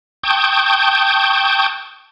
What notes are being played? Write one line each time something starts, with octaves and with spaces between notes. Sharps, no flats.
G5 A5 C#6 D#6 G6